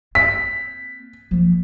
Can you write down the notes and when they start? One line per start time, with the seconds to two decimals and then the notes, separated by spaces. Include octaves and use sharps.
0.15 A#3 C4 B6
1.31 F3 A#3